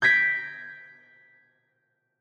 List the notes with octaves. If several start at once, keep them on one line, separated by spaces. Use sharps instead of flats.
G6 G#6 A#6 B6 D7